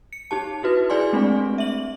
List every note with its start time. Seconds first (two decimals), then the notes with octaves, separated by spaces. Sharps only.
0.13 C#7
0.31 D#4 G4 A5
0.63 E4 F#4 B4
0.90 E4 G#4 D5 G#5 C6
1.13 G#3 A3 C4 D4
1.58 E5 F#7